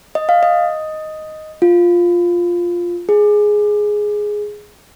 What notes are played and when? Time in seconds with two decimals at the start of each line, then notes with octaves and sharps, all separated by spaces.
0.15 D#5
0.29 F5
0.43 D#5
1.62 F4
3.09 G#4